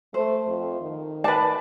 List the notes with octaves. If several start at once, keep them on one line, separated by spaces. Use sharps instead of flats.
A3 C5
F2
D#3
B4 D5 A5